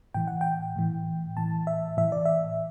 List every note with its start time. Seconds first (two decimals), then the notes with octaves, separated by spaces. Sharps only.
0.14 A2 E3 G5
0.28 F#5
0.41 G5
0.76 A2 E3
1.37 A2 E3 A5
1.67 E5
1.97 A2 E3 E5
2.12 D5
2.25 E5